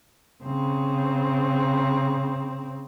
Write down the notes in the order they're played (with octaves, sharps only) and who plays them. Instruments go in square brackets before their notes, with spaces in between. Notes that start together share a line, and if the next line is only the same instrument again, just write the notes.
[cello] C#3 C4